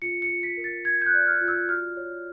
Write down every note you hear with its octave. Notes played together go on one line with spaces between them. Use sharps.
F4 C#7
C#7
F4
B6
A#4
A6
A#4 G#6
G6
F#6
D5
F6
F4
E6
F#4 F6
C#5